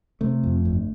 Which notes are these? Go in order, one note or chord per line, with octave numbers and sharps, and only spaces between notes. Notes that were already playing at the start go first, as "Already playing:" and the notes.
C3 A3
F2
G1